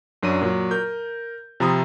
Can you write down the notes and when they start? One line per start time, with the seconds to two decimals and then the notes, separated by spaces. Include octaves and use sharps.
0.23 F#2 F#3 D4 D#7
0.41 A#2 F#3
0.71 A#4 G6
1.60 C3 F3 A#5 B5 D#6